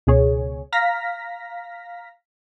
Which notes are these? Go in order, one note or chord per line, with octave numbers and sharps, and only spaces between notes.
C#2 B2 G#4 C#5
F5 A#5 F6 A#6 B6